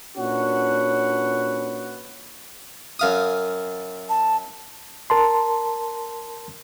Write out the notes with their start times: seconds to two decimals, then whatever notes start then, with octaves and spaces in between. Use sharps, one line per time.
0.18 A#2 C#4 D4 F#4 B4 F#5
2.99 F#2 F5 D#6
4.09 A5
5.10 A#4 A5 C6